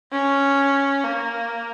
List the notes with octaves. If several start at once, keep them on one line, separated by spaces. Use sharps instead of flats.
C#4
A#3